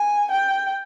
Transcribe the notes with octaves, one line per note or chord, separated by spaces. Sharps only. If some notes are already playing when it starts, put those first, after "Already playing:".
Already playing: G#5
G5